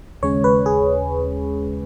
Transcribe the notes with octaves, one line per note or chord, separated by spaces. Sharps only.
D#2 C#3 G#3 C#4 C#5
B4
G#4